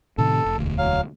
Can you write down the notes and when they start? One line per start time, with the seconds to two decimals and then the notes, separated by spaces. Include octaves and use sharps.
0.18 A2 C3 D#3 A4
0.45 F1
0.58 E1 D2
0.78 F#3 F5